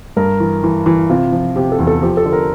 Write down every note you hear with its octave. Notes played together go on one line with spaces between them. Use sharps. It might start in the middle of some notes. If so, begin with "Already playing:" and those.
G2 A#4
E3
E3
E3
C3 F4
F3
C3 G4
A4
E2
A4
F3 G4
A4
D3
A#4